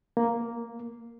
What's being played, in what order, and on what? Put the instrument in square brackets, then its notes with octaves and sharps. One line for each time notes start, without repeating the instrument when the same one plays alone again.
[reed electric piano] A#3